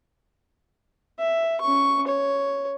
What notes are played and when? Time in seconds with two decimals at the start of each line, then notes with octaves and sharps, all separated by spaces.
1.19 E5
1.61 C#4 C#6
2.07 C#5